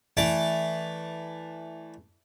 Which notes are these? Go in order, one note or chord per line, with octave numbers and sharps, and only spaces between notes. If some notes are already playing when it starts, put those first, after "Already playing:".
E3 A3 D5 A5 D6